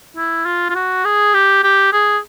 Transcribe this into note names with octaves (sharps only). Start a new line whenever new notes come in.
E4
F4
F4
F#4
G#4
G4
G4
G#4